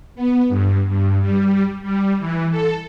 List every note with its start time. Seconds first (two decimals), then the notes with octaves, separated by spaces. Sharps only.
0.15 B3
0.49 G2
0.88 G2
1.22 G3
1.83 G3
2.19 E3
2.50 A4